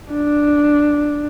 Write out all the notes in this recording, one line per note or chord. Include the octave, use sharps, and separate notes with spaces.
D4